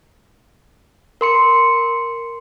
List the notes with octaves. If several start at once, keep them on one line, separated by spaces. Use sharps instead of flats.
A#4 C6 C#7